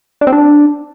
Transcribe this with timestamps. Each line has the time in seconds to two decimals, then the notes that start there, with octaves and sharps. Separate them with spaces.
0.21 D4
0.27 C4
0.32 D4